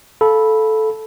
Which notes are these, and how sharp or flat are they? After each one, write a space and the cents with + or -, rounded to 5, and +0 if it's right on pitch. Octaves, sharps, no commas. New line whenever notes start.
A4 -10 F5 +0 B5 -10